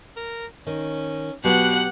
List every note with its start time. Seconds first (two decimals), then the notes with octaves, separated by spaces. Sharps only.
0.17 A#4
0.67 D#3 C#4
1.44 B2 F#3 B3 G4 F#5 F#6